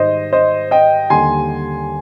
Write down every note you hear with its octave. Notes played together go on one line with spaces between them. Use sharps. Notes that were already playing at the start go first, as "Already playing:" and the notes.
Already playing: G#2 D#3 G3 C5 D#5
C5 D#5
D#5 G5
D#2 D3 G3 G#5 C6